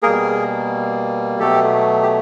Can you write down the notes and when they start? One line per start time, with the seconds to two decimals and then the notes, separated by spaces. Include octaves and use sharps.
0.03 B2 G3 A#3 G#4 A#4
1.39 B2 F#3 A3 G4 A4
2.02 G4